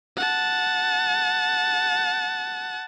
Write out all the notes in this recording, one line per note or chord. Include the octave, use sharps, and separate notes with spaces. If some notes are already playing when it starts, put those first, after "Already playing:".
F#5 A5